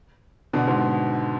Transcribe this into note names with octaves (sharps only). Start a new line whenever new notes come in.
B2 D3
G#2 B2